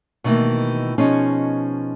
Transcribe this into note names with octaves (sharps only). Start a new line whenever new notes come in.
B2 D#3 E3 A3 A#3
B2 F3 C#4 D#4 G#4 C#5